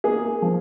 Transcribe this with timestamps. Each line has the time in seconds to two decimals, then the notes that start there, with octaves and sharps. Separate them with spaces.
0.04 A#3 G#4
0.42 F3